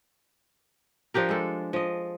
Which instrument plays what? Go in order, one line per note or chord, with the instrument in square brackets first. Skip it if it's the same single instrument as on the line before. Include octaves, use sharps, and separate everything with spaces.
[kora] F3 D4 G4 A#4
G#3 A4
F3 D#5